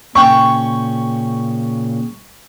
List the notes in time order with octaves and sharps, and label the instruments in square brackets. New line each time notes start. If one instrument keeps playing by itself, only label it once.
[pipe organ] A#2 C#3 [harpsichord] C#4 G5 [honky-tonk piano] C#6